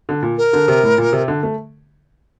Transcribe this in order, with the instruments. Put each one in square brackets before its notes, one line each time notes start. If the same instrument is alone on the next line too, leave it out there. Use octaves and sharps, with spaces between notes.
[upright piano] D3
A#2
[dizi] A#4
[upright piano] D3
C3
A2
A#2
C3
D3
A3